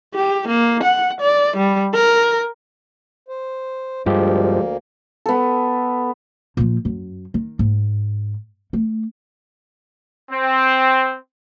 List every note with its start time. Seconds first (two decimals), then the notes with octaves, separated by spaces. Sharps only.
0.15 G4
0.48 A#3
0.83 F#5
1.21 D5
1.57 G3
1.94 A#4
3.28 C5
4.06 D2 G2 F3 G#3 A#3 G4
5.26 B3 A4
6.57 A#2 F3
6.85 F#2
7.34 D#3
7.59 G#2
8.73 A3
10.32 C4